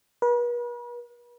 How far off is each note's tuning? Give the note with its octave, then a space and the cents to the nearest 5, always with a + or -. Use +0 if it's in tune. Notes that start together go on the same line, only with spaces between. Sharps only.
B4 -45